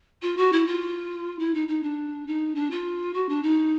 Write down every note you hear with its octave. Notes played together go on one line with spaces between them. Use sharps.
F4
F#4
E4
F4
E4
D#4
D#4
D4
D#4
D4
F4
F#4
D4
D#4